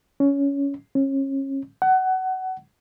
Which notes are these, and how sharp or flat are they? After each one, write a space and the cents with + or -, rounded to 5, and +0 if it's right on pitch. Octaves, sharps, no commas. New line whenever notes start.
C#4 +15
C#4 -30
F#5 +20